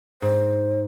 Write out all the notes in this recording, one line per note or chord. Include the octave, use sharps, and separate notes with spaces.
G#2 C5